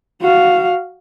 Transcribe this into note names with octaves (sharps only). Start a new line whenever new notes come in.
F#4 F5